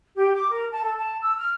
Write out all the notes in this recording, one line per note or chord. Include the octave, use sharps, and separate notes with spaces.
G4
D6
A#4
A5
A4
A5
E6
F6